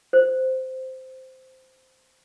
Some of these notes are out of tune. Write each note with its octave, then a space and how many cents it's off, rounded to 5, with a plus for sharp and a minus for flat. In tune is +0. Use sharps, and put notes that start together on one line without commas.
C5 -10